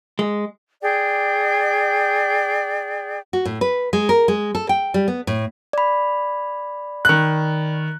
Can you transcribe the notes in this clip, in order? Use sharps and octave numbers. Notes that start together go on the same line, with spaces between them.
G#3
G#4 D5 G5
F#4
A2
B4
G#3
A#4
G#3
A4
G5
G3
B3
A2
D5 B5
D#3 F#6